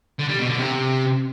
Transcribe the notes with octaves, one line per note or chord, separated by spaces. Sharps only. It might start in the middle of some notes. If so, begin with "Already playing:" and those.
D3
G3
B2
D3
C3